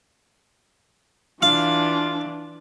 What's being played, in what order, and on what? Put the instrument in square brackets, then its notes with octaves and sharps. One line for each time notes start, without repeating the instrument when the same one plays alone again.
[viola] E3 D4 [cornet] F4 [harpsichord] F5